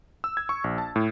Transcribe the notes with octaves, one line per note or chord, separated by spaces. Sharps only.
E6
G#6
C#6
A#1
A5
A2